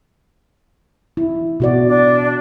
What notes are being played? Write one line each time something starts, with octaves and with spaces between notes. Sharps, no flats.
E4
B2 F#4 D5
D4